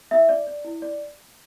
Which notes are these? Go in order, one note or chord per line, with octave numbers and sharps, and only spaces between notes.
E4 E5
D5
D5
E4
D5